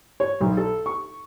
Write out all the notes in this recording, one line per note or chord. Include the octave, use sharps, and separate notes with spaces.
C#5
B1
A4
C#6